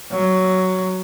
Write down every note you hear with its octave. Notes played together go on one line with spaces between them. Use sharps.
F#3